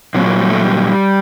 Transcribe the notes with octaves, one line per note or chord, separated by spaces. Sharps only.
A#2 F#3 C4
A#3
G3
A3
G3